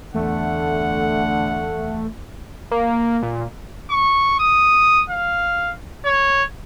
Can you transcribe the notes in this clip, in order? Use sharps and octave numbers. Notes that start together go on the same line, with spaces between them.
E2 D3 A3 F#5
A#3
A#2
C#6
D#6
F5
C#5